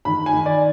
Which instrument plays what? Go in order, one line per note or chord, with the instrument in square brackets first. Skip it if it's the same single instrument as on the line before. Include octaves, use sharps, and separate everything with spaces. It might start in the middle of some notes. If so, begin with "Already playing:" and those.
[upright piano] D#3 B5
G#5
D#3
D5